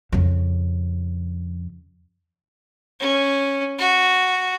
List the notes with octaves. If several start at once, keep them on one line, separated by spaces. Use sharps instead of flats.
F2 C#3
C#4
F#4